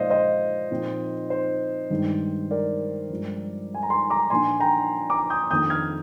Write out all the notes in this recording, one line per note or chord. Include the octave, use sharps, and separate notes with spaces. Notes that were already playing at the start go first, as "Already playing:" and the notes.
Already playing: A#2 F3 G#3 C5 D5 D#5 F5
C5 D#5
A#2 F3 C4 D#4
C5
G2 D#3 G#3 D#4
A#4 D5
G2 F3 G#3
G#5
A#5
G#5 C6
A#5 D6
A#2 F3 A#3 D4 G#5 C6
G5 A#5
A#5 D6
D#6 G6
F2 D#3 A#3 D4 D#6 G6
F6 G#6